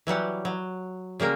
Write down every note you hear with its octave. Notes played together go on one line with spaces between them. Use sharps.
E3 F#3 G3 F#5
F#3
C#3 G3 A#3 A#4